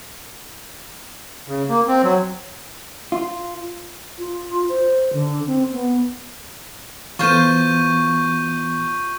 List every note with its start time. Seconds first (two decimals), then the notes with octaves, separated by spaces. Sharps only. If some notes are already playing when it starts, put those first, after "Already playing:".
1.48 C#3
1.69 A#3
1.88 C4
2.03 F#3
3.12 F4
4.19 F4
4.69 C5
5.13 D3
5.47 C4
5.73 B3
7.19 E3 B3 F4 C5 C#6 G6 D#7